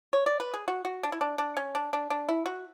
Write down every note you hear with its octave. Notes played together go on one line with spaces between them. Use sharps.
C#5
D5
B4
G#4
F#4
F#4
D4
E4
D4
D4
C#4
D4
D4
D4
E4
F#4